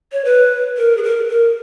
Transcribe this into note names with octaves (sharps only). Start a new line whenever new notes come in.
C#5
B4
A#4
G#4
A#4
A#4